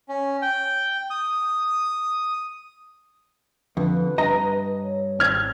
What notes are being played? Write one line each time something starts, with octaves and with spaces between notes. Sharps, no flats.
C#4
G5
D#6
F2 D3 B4
G2 D#5 A#5
C#5
G#1 C4 F6 G#6